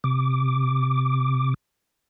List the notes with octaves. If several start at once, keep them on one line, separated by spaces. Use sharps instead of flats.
C3 D6